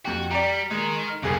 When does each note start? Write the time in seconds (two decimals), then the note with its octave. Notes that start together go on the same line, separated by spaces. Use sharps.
0.05 F2 F#4 G4
0.31 G3 D5 G5 A#5
0.71 G#3 D#4 A#4
1.08 F6
1.23 F#1 C2 G2 E3 G#4